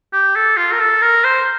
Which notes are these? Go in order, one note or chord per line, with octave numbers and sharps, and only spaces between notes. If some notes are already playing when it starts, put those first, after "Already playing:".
G4
A4
F4
A#4
A4
A#4
C5